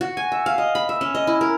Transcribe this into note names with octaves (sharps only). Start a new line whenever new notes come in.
F#4
G#5
E5
F5
D#5
B5
E5
C#4
D#5
E4
A#4